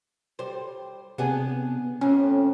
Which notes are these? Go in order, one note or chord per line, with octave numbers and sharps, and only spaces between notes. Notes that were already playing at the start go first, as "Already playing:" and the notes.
G3 C5
C3 B3 D4 G#4
F2 A2 C#4